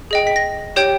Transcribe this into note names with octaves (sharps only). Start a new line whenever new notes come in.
G#4 D#5 G5
B6
A#6
G4 C#5 G5 G6